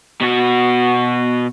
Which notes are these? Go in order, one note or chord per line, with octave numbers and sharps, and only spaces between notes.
B2 F#4